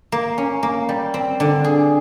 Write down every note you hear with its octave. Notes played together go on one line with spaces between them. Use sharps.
A#3
C#4
A#3
G3
C4
D3
G#4